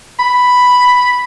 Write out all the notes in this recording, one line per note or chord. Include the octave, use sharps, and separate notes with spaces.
B5